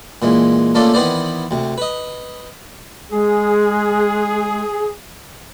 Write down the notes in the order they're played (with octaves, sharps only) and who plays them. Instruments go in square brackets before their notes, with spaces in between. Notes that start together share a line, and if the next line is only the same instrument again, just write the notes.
[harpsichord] A#2 E3 G#3
A3 A#3 C#4 F4 A4 D5
D#3 E3 B3 B4 C5 D5
D2 C3
B4 D#5
[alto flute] G#3 [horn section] G#4